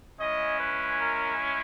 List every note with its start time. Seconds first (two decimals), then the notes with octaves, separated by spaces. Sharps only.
0.18 G#3 C#4 E4 D#5
0.58 B4
0.98 A#4